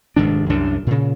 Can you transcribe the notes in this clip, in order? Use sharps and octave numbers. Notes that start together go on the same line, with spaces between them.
F1 G#2 D#3 D4
C2 F#2 D4
A#2 C#3